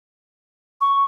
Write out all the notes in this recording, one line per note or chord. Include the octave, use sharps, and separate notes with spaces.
C#6